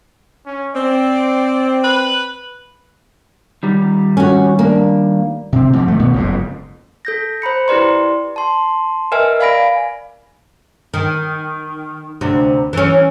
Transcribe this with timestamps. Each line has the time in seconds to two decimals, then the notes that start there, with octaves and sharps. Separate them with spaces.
0.46 C#4
0.75 C4 D5
1.84 B4
3.63 D#3 G3
4.17 C#4 F#4
4.59 A#3 D4
5.53 C3 C4
5.73 G#2 F3
5.88 D#3 F3 A3
5.99 C#2 B2 B3
6.14 F#1 F2 G#2
7.05 A4 G6 A#6
7.42 C5 A#5 B5 C#7
7.68 E4 G4 B4 D5 C6
8.36 A5 C6
9.12 A#4 B4 D#5 E5 G#5 F6
9.40 D5 F5 G#5 B5 A#6 D7
10.94 D#3
12.21 D2 C3
12.73 E3 C#4